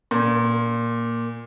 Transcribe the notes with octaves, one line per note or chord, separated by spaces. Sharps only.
A#2